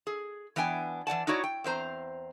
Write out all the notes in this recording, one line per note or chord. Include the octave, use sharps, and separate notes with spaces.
G#4
E3 B3 D4 G5 G#5
E3 D5 F#5 A5
D#4 E4 F#4 C#5 D5
G5
E2 C4 C5 A#5